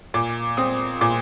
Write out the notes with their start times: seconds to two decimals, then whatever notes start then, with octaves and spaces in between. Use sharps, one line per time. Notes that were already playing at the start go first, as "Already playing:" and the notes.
0.14 A#2 D6
0.57 C4 D#6
1.01 A#2 D6